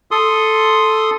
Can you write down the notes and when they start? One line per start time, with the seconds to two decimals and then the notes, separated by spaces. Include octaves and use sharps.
0.11 A4 C6 D#6